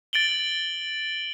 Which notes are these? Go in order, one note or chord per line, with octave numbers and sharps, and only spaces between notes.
A6 D7 F#7 G7